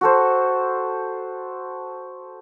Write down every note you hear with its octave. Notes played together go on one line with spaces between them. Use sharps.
F#4 A4 C5